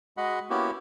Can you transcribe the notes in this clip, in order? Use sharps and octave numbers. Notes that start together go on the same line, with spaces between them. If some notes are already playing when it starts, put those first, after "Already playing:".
G#3 F#4 D#5 F#5 B5
A#3 B3 C#4 E4 F#4 G4